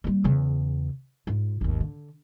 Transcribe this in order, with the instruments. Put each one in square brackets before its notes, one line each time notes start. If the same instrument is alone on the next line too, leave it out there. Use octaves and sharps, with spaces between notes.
[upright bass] G3 A#3
E2 C#3
G#2 F4
G#1 D#2
D3